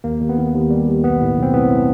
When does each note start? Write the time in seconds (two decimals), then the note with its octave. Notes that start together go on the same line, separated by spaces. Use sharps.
0.04 D#2 A#3
0.21 D#2
0.29 B3
0.38 D#3
0.54 D#2
0.70 G3
0.87 D#2
1.04 B1 B3
1.21 A2
1.37 B1
1.43 C4
1.54 A2 B3
1.70 A2